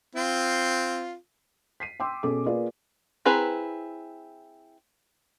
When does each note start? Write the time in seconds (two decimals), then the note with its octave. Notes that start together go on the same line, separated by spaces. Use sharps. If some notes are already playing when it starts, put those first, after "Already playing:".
0.15 C4 F4
1.80 B6 C7 D#7
2.00 G5 C6 D6 E6
2.23 B2 C#4 G#4 A4 D6
2.46 A#3 F4 G#4 B4 D5
3.25 C4 E4 G#4 B4 A#5